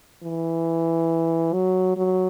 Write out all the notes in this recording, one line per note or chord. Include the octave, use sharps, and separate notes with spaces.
E3
F#3
F#3